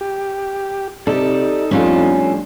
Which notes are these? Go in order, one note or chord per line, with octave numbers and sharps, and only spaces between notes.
G4
C3 D#4 G4 A4 D5
F2 A2 G3 C#4 D4 F4 A4